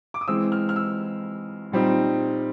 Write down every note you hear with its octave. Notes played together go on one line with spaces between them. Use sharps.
D6
D#6
E3 G#3 C4 E6
F6
F6
E6
A#2 G3 C4 D#4